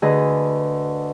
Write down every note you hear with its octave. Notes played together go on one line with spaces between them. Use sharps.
D2 D3 G#4 B4 D#5